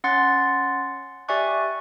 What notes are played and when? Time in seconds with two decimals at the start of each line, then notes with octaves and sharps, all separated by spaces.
0.04 C#4 F#5 C6 A6
1.28 G4 D5 E5 G#5 C#6 F#6